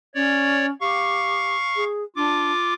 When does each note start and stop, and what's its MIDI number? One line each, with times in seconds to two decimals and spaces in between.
0.15 0.70 61
0.15 0.66 73
0.15 0.66 74
0.81 1.57 67
0.81 1.84 77
0.81 1.84 85
1.76 2.03 68
2.16 2.52 62
2.16 2.74 65
2.16 2.74 86